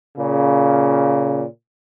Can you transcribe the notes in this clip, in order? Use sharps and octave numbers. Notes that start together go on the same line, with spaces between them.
A#2 C#3